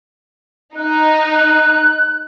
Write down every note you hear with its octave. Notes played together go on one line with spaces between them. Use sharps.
D#4 F#6
F#6